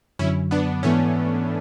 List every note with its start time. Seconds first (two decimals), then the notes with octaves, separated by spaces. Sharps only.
0.19 F#2 D3 F#3 C#4 E4
0.51 B3 D4
0.83 G#2 E3 A3 B3 C#4